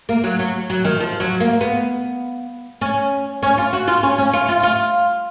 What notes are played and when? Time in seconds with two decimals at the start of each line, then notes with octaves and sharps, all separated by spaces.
0.09 A#3
0.24 F#3
0.39 F#3
0.70 F#3
0.85 D#3
1.00 F3
1.20 F#3
1.40 A#3
1.61 B3
2.81 C#4
3.43 C#4
3.58 F4
3.73 F#4
3.88 F4
4.03 C#4
4.18 C#4
4.33 F4
4.48 F4
4.63 F4